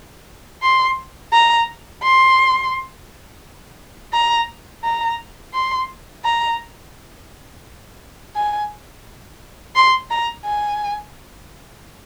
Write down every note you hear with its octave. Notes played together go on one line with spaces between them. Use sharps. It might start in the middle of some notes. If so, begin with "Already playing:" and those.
C6
A#5
C6
A#5
A#5
C6
A#5
G#5
C6
A#5
G#5